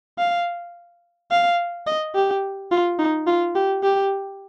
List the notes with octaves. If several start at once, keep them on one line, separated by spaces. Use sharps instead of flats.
F5
F5
D#5
G4
F4
D#4
F4
G4
G4